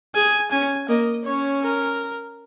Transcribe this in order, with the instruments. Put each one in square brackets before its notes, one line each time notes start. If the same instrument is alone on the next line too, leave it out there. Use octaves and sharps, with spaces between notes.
[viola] G#4 [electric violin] G#5
[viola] C#4 [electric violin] G#5
[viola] A#3 [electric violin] D#5
[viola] C#4 [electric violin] C#5
[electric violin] A#4